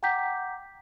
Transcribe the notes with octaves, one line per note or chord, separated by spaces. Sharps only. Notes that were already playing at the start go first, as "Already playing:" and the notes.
F#5 G5 A#5 D6 G6 B6